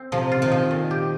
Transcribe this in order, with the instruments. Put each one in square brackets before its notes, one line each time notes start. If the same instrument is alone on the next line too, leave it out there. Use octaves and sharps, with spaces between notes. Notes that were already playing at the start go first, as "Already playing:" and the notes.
Already playing: [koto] C4
[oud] C3 [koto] F3
[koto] F4
[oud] D#3
[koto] F3
A#2
G4